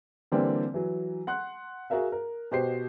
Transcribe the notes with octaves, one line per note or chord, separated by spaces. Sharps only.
D3 E3 G3 A#3 C4 D5
E3 F#3
F#5 C6 F#6
F#4 G#4 A#4 E5 F5
A#4
B2 F#4 G4 C5 D#5 C7